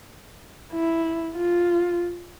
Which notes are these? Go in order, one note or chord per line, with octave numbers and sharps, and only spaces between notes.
E4
F4